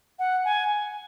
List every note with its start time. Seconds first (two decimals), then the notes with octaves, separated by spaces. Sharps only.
0.19 F#5
0.45 G#5